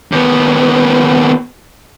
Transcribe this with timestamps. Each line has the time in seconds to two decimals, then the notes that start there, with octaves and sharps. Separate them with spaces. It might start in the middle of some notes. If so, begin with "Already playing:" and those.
0.12 D#2 B3